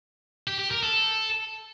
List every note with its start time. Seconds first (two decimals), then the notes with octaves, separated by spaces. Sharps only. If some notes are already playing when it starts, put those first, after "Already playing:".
0.47 G4
0.59 G4
0.71 A#4
0.83 A4